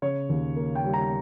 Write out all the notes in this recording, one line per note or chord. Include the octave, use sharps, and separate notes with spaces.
C#3 C#5
D#2
A#3
G5
G3
A#5